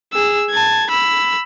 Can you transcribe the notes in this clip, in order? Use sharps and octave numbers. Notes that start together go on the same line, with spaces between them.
G#4 E6
A5 G#6
B5 E6